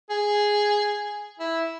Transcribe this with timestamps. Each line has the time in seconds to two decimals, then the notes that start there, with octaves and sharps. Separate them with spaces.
0.10 G#4
1.39 E4